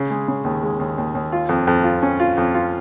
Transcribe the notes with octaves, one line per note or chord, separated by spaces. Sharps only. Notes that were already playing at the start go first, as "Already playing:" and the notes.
Already playing: C#3
G#3
C#3
D#2
G#3
D#2
D#2
D#2
F4
F2
F2
F4
C#4
F4
F2
F4